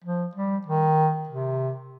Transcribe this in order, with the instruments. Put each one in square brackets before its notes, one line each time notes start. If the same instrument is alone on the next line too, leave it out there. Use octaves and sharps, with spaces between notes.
[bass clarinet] F3
G3
D#3
C3